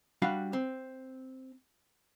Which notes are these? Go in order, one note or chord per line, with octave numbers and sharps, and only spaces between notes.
G3 D4 F#4 F5
C4